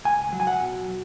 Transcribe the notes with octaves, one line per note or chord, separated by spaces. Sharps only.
C#2 G#5
F#3
G#5
F#5
B2